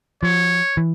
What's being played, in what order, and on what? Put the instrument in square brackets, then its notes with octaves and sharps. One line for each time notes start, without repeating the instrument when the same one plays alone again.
[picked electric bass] F3 [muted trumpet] C#5
[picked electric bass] E3